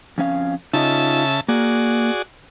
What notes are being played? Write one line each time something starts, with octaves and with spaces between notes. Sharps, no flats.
F2 C#4 F5
C#3 D#4 F4 D#5 E5 A5
A#3 F#4 G#4 D5